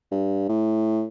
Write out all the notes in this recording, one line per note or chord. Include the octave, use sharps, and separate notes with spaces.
G2
A2